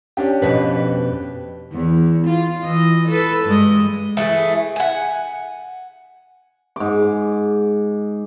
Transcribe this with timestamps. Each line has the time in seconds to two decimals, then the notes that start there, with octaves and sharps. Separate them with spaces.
0.17 C#4 D4 G4
0.42 F2 B2 B4
1.72 E2
2.27 F4
2.63 E3 D#5
3.09 A4 B4
3.45 G2 G#3 D#5
4.17 E3 A3 G#4
4.76 F#5 G#5
6.76 G#2 D6